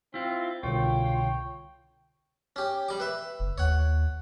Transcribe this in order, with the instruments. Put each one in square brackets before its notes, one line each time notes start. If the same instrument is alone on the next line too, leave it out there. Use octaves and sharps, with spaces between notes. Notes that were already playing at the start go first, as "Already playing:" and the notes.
[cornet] C4 [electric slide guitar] E4 F4
[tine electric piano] C2 B2 D3 [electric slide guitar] F4 [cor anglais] C#5 [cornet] G5
[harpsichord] C#4 G4
G3 D6
B4 E5
[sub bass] F#1
[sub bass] D#2 [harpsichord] C#5 F#5